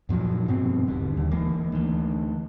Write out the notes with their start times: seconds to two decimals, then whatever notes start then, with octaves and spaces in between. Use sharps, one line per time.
0.09 F#2 A#2 F3 F#3
0.48 G2 B2 C4
0.87 D#1 G2 D3
1.17 D#2
1.31 E3 G#3 A#3
1.72 D2 E3